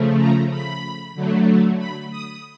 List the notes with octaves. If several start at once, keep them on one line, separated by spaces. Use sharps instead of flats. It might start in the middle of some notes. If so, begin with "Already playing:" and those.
Already playing: C#3 F3 A3
A#5
B5
D3 F#3 A3
B5
D#6